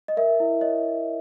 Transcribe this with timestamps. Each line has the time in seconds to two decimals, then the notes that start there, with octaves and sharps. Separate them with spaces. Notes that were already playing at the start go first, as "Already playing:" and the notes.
0.08 D#5
0.17 A#4 E5
0.40 E4
0.61 C#5 D#5